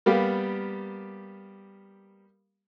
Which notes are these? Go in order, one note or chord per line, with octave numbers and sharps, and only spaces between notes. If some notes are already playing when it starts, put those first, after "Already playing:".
G3 A#3 B3 G4 F5